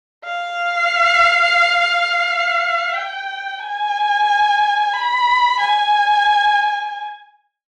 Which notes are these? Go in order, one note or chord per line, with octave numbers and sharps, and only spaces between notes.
F5
G5
G#5
B5
G#5